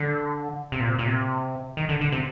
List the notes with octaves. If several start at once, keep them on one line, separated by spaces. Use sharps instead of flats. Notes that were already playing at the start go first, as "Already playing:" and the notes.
Already playing: D3
C3
A#2
C3
A#2
C3
D#3
D3
D3
C3